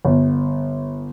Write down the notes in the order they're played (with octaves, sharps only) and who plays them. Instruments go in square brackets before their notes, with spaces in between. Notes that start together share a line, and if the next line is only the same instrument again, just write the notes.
[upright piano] G1